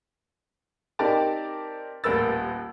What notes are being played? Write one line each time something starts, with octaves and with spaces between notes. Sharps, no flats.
C4 D#4 G4 A#4 D5 A5
D#1 A1 A#4 B4 E6 A6